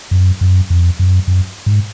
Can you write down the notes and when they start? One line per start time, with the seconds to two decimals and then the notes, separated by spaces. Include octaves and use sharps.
0.11 F#2
0.41 F#2
0.70 F2
0.99 F#2
1.28 F#2
1.66 G#2